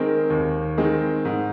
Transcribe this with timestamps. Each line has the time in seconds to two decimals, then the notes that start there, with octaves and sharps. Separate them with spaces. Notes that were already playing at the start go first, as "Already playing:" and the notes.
Already playing: D#3 G#3 C4 A#4
0.30 D#2
0.77 D#3 G#3 C4
1.25 G#2